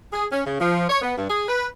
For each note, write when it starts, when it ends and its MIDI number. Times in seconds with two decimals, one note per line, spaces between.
0.13 0.26 68
0.32 0.42 61
0.46 0.57 49
0.61 0.85 53
0.90 1.00 73
1.02 1.14 59
1.18 1.29 43
1.30 1.45 68
1.48 1.67 71